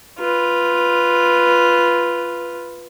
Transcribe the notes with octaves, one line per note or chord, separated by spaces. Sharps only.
F4 B4